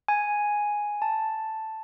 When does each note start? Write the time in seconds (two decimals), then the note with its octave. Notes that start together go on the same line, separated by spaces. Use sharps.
0.08 G#5
1.02 A5